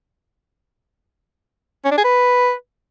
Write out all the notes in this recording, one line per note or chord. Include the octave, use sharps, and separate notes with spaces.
C#4
D4
G#4
B4